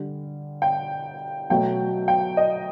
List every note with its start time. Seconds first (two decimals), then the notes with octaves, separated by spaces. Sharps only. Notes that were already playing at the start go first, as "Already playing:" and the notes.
Already playing: D3 G3
0.62 G5
1.50 B2 F#3 A3 G5
2.08 G5
2.37 D#5